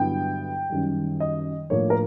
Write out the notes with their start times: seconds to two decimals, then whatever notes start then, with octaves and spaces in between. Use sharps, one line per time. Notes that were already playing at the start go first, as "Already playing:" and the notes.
Already playing: G2 D3 F#3 B3 E4 G5
0.70 F#2 D#3 G3
1.20 D#5
1.70 A2 F3 A#3 D4 C#5
1.90 A#4